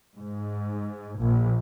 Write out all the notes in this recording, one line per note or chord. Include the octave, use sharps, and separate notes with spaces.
G#2
A#1